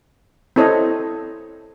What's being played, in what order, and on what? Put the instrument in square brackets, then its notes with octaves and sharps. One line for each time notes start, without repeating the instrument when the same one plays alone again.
[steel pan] C4 E4 A4 C#5 D#5